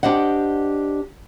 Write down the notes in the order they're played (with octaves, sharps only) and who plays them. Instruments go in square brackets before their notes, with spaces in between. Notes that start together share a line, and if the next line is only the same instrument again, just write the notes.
[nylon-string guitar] D4 G4 C5 D#5 F#5